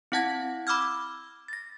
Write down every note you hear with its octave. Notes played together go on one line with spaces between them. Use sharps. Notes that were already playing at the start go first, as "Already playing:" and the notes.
C4 E4 F#5 A5 G#6 A#6
B5 D6 E6 F6 G#6
A6 A#6